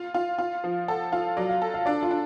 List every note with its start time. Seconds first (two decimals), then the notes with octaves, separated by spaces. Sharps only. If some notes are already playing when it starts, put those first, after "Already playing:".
Already playing: F4 F5
0.14 F4
0.39 F4
0.64 F3
0.88 A4 F#5
1.12 F4 F5
1.37 F#3 D5
1.49 F5
1.62 A4
1.74 F5
1.86 D4 D5
2.03 F4
2.11 D4